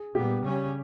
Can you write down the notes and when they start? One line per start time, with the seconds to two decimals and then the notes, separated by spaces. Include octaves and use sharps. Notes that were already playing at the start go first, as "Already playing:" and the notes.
Already playing: G#4
0.15 A#2 G3 B3 G4
0.44 C#3 G3 C#4